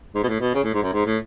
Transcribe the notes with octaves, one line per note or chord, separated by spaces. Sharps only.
G#2
B2
A2
B2
C#3
A2
G#2
F#2
G#2
A2